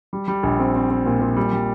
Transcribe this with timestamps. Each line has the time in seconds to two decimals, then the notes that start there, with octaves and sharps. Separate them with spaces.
0.13 G3
0.28 G3
0.43 A#1
0.59 C4
0.75 C4
0.90 C4
1.06 A#2
1.21 A#2
1.36 G3
1.53 G3